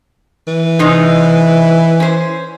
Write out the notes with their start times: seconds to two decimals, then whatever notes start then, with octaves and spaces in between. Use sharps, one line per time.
0.48 E3
0.79 C3 G#3 D#4
2.00 C#4 C5